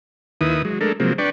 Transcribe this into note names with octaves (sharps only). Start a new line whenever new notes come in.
D#2 D#3 E4 B4 D#6
F#3 G#3
G#3 A3 D4 A4 A#4
C3 F3 F#3 G#3 A#3 C4
D4 B4 D5 G5 C#6